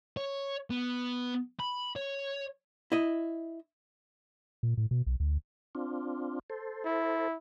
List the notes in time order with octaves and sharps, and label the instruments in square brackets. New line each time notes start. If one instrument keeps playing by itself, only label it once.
[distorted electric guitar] C#5
B3
B5
C#5
[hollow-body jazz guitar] E4 D#5
[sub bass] A#2
A2
B2
B1
D2
[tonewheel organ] C4 D4 F4
A4 C5
[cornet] E4